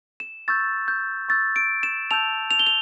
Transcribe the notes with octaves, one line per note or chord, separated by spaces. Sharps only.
E7
C#6 E6 G6 A6
G6
C#6 E6 G6 A6
D7
E7
A5 E6 G6 F7
F7
G7
F7